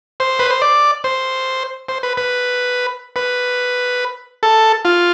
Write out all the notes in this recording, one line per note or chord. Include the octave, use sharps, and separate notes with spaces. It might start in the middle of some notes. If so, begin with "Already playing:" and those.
C5
B4
C5
D5
C5
C5
B4
B4
B4
A4
F4